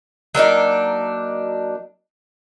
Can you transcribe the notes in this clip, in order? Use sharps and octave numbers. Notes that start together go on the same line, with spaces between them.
F#3 A#3 D4 D#4